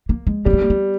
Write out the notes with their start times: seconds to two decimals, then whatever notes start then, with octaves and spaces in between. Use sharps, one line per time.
0.09 A#3
0.27 G#3
0.45 G3 C#4
0.53 B3
0.61 A#3
0.70 B3